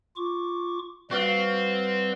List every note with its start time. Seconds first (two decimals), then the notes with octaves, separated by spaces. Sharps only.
0.16 F4 C#6 D6
1.11 G3 C4 F#4 B4 D5 F5